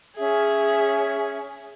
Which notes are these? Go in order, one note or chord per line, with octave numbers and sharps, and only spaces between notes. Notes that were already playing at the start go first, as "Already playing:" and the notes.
C#4 G#4 E5